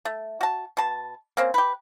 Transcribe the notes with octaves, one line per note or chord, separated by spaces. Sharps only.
A3
F#4 A5
B2 A5
A#3 C4 C#4
G4 B4